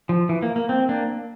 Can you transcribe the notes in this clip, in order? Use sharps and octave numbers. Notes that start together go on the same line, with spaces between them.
F3
E3
A#3
A#3
C4
A#3 D4